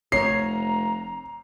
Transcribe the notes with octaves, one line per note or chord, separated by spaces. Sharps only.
F1 C#5 A#5 C7